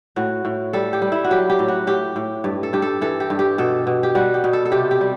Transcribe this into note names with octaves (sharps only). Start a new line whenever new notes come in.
A2 F#4
A2
G3 A4
G4
G3
E4
F#4
F#3 G4
G4
A2
F#4
A2 G4
A2
G2
A4
G2 G4
A4
E3 A4
G4
G2
G4
B2 A4
B2
G4
G3 F#4
G4
B2
A4
A4
C3 G4
G4
G3